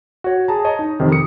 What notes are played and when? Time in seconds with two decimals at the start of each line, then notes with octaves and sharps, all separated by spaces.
0.24 F#4 C#5
0.48 G#4 A5 A#5
0.65 C#5 D#5 A5
0.79 D#4
1.00 F2 C3 D#3
1.12 D#6 C#7